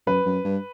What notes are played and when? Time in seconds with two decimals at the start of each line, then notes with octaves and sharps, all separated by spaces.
0.07 F#2 B4
0.26 F#2
0.45 G2